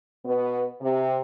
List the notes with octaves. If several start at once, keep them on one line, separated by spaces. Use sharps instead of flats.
B2 B3
C3